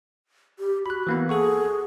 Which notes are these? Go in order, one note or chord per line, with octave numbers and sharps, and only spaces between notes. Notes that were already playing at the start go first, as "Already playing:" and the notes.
G4
F#4 B5 F#6
E3 A#3 B3
G#4 A4 F#5 C#6